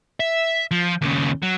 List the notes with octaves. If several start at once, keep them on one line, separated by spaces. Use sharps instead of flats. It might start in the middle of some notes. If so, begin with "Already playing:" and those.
E5
F3
D#2 C#3
F#3